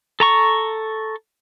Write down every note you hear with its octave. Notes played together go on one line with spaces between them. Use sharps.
A4 A#5 C#6